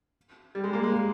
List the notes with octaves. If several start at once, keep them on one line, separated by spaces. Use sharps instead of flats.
G3
G#3
A#3
G#3